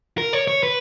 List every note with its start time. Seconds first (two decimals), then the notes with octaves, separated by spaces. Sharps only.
0.18 A#4
0.33 C#5
0.48 C#5
0.63 B4